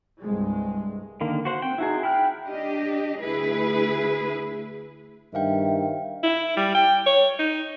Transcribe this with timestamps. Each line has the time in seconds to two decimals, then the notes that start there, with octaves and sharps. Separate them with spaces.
0.21 C2 G2 G#3
1.21 D3 D#3 A#3 A#4
1.45 F#4 C5 F#5
1.62 C4 G5
1.78 D#4 E4 F#4 G#4
2.03 E4 G5 F6 F#6
2.47 D4 G4 D#5
3.21 D2 E4 G#4 B4
5.34 G2 D#3 C5 E5 F5 G5
6.23 E4
6.56 G3
6.75 G5
7.06 C#5
7.39 D#4